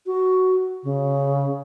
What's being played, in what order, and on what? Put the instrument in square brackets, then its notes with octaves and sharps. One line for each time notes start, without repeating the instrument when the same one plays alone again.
[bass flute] F#4
C#3